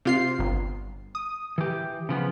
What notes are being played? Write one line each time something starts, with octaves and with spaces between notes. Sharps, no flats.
C3 F4 C7
G1
D#6
E3 G4
C#3 F3 B3